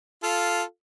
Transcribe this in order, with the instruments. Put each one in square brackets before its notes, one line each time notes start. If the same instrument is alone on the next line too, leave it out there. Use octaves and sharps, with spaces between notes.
[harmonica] F4 A4 F5